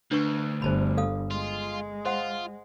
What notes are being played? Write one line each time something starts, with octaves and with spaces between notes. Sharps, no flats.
D2 D4 B4 C#6
G1 C5 A5 B5
A4 F5 D#6
G#3 F4
F4 C5 F#5